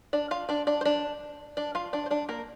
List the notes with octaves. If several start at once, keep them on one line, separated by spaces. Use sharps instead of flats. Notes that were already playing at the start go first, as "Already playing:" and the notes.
D4 D5
F4 F5
D4 D5
D4 D5
C5
D4 D5
D4 D5
F4 F5
D4 D5
C5
D4 D5
A#3 A#4